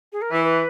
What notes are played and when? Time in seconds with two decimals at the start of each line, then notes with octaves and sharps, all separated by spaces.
0.12 G#4
0.22 A#4
0.31 E3 B4
0.44 B4